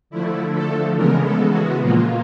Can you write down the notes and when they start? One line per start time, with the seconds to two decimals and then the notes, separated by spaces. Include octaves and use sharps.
0.10 D3 F3 A3 E4
0.54 A4
0.95 C#3 E3 G#3 B3 A#4
1.23 A4
1.51 F#4
1.80 A#2 F3 A#3 F4